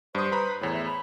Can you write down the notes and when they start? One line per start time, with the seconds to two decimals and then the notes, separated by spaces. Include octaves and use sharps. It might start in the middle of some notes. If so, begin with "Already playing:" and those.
0.15 G2 C5 D#6
0.32 B4 A#5 B5
0.61 E2 A2 C#5
0.73 E5
0.86 B5